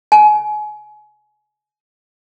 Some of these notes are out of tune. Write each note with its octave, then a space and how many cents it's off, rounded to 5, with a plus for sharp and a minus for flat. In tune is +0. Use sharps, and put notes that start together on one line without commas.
G#5 +30